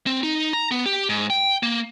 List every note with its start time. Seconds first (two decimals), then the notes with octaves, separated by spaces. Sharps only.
0.07 C4
0.23 D#4
0.53 A#5
0.71 B3
0.86 G4
1.09 G#2
1.30 G5
1.63 A#3